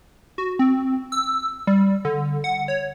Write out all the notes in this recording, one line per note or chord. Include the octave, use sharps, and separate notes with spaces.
F#4
C4
E6
G3
D3
F#5
C#5